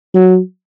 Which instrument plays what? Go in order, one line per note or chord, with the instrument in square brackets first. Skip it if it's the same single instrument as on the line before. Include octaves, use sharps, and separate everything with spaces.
[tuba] F#3